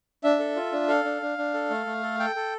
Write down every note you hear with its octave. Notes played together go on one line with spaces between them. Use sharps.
D4 E5
A4
F4
D4
A4 F5
D4
D4
D4
A4
A3
A3
A4
A4 G5
A4